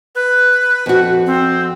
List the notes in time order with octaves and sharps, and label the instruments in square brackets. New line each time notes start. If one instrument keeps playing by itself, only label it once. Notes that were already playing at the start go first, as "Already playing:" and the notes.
[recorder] B4
[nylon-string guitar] F2 F#4
[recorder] C4